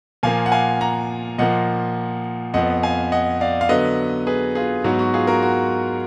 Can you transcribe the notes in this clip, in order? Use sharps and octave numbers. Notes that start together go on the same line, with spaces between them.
A#2 F3 A#3 F5 G#5
F#5
F5 G#5
F#5 A#5
A#2 F3 A#3 D#5 F#5
F2 F3 B3 D#5 F#5
F5 G#5
D#5 F#5
D5 F5
F5
D3 F#3 B3 B4 D#5
G#4 B4
F4 G#4
G#2 F#3 B3 F#4
F#4
F4 G#4
F#4 A#4
F#4